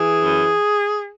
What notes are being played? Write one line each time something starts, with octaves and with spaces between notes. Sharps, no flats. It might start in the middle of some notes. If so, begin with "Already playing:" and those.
Already playing: E3 G#4
F#2